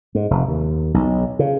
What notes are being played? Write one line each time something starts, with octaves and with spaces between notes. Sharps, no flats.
G#2
F1
D#2
B1
C#3